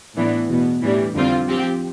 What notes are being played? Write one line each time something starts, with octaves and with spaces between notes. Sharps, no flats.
A2 E3 B3 D4
E2 B2 B3
A2 E3 G3 D4
F2 D3 G3 C4 F4
F3 C4 G4